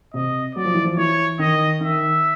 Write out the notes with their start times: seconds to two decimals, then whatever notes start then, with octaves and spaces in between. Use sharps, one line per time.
0.14 C3 D#5
0.55 F#3 D5
0.65 F3
0.74 E3
0.84 F3
0.97 E3 C#5
1.39 D#3 D#5
1.80 D#3 E5